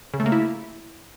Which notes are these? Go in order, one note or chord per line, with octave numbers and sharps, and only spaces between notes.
C#3
A3
A#3
E4